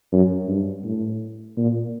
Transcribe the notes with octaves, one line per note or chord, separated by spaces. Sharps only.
F#2
G2
A2
A#2